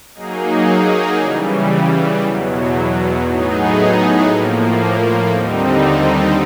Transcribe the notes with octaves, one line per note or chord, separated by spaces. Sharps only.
F#3 A#3 D#4 G#4
C#3 E3 G3
E2 B2 F#3
A2 F#3 B3 D#4 G#4
A2 F3 A#3
D#2 D3 G3 C4 D#4